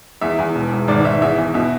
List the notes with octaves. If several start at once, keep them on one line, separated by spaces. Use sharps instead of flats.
E2 E5
E2
E1
E1
G#1 D5
G#1 E5
E2 E5
E2
B2 E5